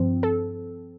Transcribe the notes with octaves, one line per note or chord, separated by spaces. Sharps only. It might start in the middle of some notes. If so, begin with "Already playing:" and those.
Already playing: G2 F3 C4
A4